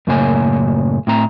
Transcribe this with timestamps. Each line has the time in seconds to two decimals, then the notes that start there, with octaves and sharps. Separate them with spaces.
0.07 F#2 A2 C#3 A#3 C#5 G#5
1.07 A2 C4 A#5